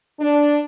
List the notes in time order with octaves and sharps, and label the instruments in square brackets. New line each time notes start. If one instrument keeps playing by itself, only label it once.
[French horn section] D4